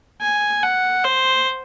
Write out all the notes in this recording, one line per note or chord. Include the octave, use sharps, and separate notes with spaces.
G#5
F#5
C5